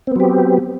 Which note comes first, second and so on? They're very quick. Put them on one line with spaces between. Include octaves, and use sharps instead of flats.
C4 B3 F#3 G4